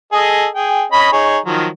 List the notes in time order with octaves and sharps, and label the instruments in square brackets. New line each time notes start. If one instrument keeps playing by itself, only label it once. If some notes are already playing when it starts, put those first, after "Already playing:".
[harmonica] G#4 A4 D#5
G#4 G5
C#4 D#5 B5
D#4 G#4 C#5
D#3 F3 F#3